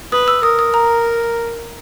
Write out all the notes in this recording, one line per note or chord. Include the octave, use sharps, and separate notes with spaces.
B4 D#6
E6
A#4 D#6
D#6
A#5